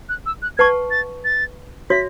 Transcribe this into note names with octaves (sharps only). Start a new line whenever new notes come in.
F#6
E6
F#6
B4 F#5 A5 C#6 G#6
A6
A6
F#4 C#5 E5 B6